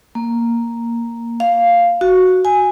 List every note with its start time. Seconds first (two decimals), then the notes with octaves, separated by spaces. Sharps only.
0.15 A#3
1.40 F5
2.01 F#4
2.45 G#5